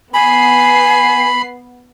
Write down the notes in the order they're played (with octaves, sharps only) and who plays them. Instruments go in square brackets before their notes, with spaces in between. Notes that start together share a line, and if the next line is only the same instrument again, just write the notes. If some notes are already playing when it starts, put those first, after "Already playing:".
[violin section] B3 C7 [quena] G#5 [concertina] B5